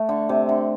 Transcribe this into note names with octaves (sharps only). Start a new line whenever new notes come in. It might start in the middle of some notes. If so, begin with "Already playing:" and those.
Already playing: A3
D3
C3
D3